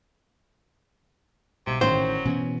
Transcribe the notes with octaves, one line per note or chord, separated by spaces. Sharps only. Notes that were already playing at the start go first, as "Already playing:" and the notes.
B1 C3
A1 D#3 F#3 C5 G5
B2 E3 B3 C#4